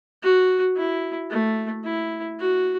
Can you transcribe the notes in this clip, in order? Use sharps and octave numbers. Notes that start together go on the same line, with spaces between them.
F#4
E4
A3
E4
F#4